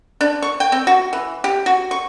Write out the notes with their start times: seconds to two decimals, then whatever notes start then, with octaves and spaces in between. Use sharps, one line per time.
0.21 D4
0.42 C#6
0.60 G5
0.72 C4
0.87 F#4
1.13 E3
1.44 G4
1.66 F#4
1.91 C#6